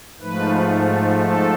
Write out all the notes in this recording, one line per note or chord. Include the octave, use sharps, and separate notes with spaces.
G#2 F3 A3 B4
A4